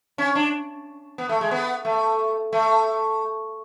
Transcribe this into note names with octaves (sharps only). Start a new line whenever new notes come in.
C#4
D4
B3
A3
G#3
B3
A3
A3